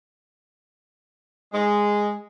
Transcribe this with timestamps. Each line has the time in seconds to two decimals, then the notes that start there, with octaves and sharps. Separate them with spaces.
1.54 G#3